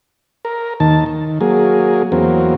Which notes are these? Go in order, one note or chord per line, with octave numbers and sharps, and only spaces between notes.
A#4
D#2 D#3 A5
D#3
F#3 A#3 G#4
E2 F#3 A#3 C4